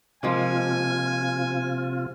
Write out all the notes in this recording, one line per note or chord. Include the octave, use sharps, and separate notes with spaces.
C3 F3 G#3 A#3 F4 G#5